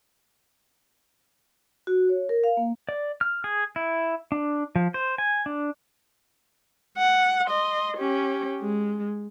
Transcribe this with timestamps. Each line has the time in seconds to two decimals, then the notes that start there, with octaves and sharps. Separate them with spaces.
1.87 F#4
2.09 C#5
2.29 A#4
2.44 F5
2.57 A#3
2.89 D5
3.21 F6
3.44 G#4
3.76 E4
4.32 D4
4.76 F3
4.94 C5
5.18 G#5
5.46 D4
6.97 F#5
7.47 D#5 C6
7.97 C#4 G4
8.60 G#3